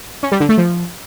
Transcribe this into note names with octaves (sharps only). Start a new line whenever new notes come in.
C#4
G3
D3
A3
F3